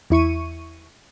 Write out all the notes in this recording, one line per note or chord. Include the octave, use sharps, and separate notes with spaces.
E2 E4 C#6 D#7